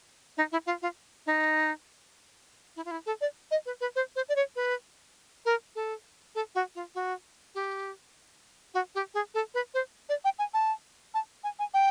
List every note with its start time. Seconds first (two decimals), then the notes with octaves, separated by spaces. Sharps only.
0.37 D#4
0.52 E4
0.66 F4
0.82 F4
1.26 D#4
2.76 E4
2.85 F4
2.91 E4
3.06 A4
3.21 D5
3.51 D#5
3.66 B4
3.81 B4
3.96 C5
4.16 C5
4.29 D5
4.36 C#5
4.56 B4
5.45 A#4
5.76 A4
6.35 A4
6.55 F#4
6.75 F4
6.95 F#4
7.55 G4
8.74 F#4
8.95 G4
9.14 G#4
9.34 A4
9.54 B4
9.74 C5
10.09 D5
10.25 G5
10.39 G#5
10.54 A5
11.14 A5
11.44 G#5
11.59 G#5
11.74 G5